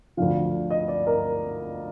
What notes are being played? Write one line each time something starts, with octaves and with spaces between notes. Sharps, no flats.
D2 D3 F3 F5
D#5
D5
A#4